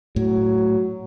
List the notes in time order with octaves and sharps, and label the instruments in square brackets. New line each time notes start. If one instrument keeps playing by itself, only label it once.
[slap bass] A2 [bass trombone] F#3